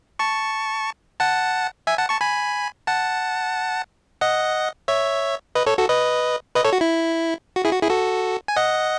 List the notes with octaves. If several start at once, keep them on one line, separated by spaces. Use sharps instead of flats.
A5 C#6
F#5 A5
E5 G#5
F#5 A5
A5 C#6
G#5 B5
F#5 A5
D#5 F#5
C#5 E5
B4 D#5
A4 C#5
F#4 A4
B4 D#5
B4 D#5
A4 C#5
F#4
E4
F#4
E4 G#4
F#4
E4 G#4
F#4 A4
G#5
D#5 F#5